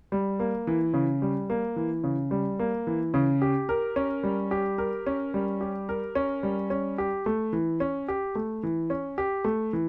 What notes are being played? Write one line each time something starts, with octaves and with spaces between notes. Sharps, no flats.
G3
A#3
E3
C#3
G3
A#3
E3
C#3
G3
A#3
E3
C#3
G4
A#4
C#4
G3
G4
A#4
C#4
G3
G4
A#4
C#4
G3
C#4
G4
A3
E3
C#4
G4
A3
E3
C#4
G4
A3
E3